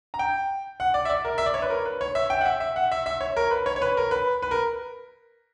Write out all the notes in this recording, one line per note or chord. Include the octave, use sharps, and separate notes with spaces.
A#5
G5
F#5
D5
E5
D5
A#4
E5
D5
C#5
B4
A#4
B4
C#5
E5
G5
F#5
E5
E5
F#5
E5
E5
C#5
A#4
B4
C#5
C#5
B4
A#4
B4
B4
A#4